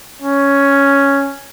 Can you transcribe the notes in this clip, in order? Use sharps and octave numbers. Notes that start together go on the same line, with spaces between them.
C#4